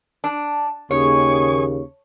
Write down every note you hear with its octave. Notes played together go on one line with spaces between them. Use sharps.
D4
D#2 C#3 G#4 C#5 C#6